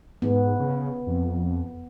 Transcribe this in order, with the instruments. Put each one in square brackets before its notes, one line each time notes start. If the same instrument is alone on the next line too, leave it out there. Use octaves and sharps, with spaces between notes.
[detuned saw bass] G#2 [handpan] B3
[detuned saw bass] C#3
F2